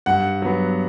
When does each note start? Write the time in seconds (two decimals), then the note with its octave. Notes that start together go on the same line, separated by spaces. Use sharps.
0.06 G2 F#5
0.42 F#3 B3